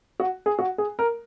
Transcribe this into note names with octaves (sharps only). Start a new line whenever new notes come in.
F#4
G#4
F#4
G#4
A#4